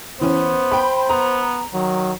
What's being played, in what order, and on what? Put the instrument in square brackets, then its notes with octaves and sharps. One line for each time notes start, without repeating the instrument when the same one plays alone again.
[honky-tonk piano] E3 C#4 [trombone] B3 [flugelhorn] C5
[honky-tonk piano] G5 B5
[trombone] B3 [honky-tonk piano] A#5
[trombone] D#3 [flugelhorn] F#3